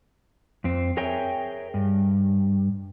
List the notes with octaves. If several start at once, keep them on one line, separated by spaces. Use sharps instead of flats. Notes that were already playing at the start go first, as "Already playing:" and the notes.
F2 C4
G#4 A#4 C#5 E5 G5 G#5
G2